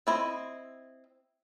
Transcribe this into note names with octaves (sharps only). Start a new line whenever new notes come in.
C4 E4 D#5